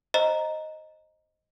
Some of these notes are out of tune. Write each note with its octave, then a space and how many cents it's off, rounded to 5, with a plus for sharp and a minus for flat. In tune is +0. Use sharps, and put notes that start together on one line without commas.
C5 +20 D#5 +0 A#5 +0